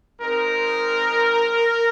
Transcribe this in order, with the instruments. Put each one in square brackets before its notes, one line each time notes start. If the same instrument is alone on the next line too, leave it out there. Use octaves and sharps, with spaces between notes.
[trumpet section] G#3 C4 D#4 A#4